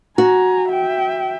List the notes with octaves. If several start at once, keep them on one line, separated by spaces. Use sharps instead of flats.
F#4 G#5 A#5
E5 G5